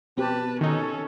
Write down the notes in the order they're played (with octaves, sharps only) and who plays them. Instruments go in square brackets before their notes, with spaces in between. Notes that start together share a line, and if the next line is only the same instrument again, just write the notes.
[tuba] B2 [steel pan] C4 G4 [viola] B4 A5
[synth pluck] D#3 D#4 [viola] C#4 A4